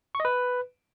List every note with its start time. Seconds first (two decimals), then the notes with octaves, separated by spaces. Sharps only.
0.15 C#6
0.20 D#5
0.25 B4